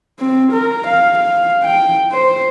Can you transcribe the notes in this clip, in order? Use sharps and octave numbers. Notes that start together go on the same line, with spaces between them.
C4
A#4
F5
F5
G5
C5